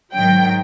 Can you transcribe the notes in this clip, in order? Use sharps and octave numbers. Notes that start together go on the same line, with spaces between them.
G#2 D#3 F#3 G5